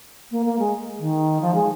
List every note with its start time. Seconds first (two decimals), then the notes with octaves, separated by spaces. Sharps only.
0.31 A#3
0.45 A#3
0.58 G#3
0.99 D#3
1.41 F3
1.54 G#3